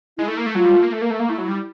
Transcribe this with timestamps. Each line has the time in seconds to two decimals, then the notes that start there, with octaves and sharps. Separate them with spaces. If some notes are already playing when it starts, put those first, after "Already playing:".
0.18 G#3 E4
0.28 A3
0.37 A#3
0.46 A3
0.55 F#3 F4
0.65 G3
0.75 A3
0.83 A#3
0.92 A3
1.02 A#3
1.10 A3
1.20 A#3
1.29 A3 E4
1.38 F#3
1.48 G3